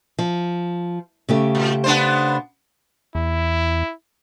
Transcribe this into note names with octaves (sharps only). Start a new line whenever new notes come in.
F3
C#3 A3 G4
A#2
B3 D4 C5
E2 E4